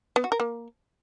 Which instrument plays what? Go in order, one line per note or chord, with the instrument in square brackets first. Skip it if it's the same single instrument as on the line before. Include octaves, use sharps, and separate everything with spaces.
[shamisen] B3
F#4
A#4
A#3